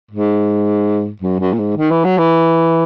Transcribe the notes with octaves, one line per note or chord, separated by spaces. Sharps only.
G#2
F#2
F#2
A#2
G#2
D#3
E3
F#3
E3